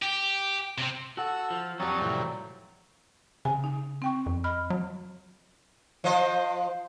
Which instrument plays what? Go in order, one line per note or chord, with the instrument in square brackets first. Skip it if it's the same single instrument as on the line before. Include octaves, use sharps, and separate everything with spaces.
[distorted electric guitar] G4
C3 C4
[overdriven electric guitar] F#4 F#5 [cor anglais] A4 [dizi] E6
[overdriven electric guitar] F3
[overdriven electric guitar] F2 G3 [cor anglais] F#3 [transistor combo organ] C#5 A5 D#6 [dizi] A#5
[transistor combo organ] A2 C3 E3
[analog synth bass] C#3 [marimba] G#5
[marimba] D#4
C4 G5 C#6
[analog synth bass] F2
[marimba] D#5 B5 F6
[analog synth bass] F#3
[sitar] F3 C5 D#5